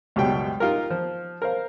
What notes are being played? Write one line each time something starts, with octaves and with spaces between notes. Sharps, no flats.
C#2 F#2 B2 G3 G5
D#4 F4 G4 A#4
F3
A#4 C5 F5